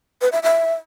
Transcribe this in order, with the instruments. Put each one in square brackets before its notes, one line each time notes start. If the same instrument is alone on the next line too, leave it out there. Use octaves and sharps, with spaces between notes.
[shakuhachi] B4
E5
E5